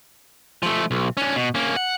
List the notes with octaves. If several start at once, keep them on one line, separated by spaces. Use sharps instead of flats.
F3 A3
B1
C#4 D4
B2
A#3 C#4
F#5